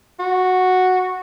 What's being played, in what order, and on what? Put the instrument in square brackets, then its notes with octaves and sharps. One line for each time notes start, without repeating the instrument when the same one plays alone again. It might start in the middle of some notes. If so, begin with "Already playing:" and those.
[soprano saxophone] F#4